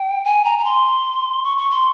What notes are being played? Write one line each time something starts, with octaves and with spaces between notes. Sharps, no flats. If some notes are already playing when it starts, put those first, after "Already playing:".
Already playing: G5
G#5
A#5
A#5
C6
C#6
C#6
C6